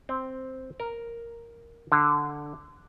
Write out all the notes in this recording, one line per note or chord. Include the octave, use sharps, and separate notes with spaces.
C4
A#4
D3